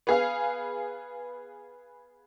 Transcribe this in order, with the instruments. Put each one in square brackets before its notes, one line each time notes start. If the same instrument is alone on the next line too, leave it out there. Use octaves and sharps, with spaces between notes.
[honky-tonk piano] B3 G#4 F5